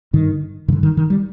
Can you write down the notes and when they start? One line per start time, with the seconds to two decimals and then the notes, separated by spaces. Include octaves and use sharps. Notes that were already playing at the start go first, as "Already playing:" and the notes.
0.13 G2 D3 D#3
0.68 G2 D#3
0.72 D3
0.83 D#3
0.97 D#3
1.10 G3